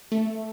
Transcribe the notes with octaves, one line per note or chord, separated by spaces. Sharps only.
A3